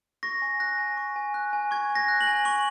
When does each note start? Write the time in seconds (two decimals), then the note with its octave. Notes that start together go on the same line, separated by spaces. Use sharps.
0.23 C#6 A#6
0.42 G#5
0.60 F#6 A#6
0.78 G#5
0.97 C#6
1.16 G#5
1.34 F#6
1.53 G#5
1.71 C#6 G#6
1.90 G#5
1.95 A#6
2.08 F#6
2.21 F#7
2.27 G#5
2.45 C#6 F#7